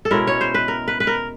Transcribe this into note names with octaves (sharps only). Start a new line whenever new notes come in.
A4
B2 G#3 C#4 E4 A#4
C#5
C5
B4
A#4
B4
B4
A#4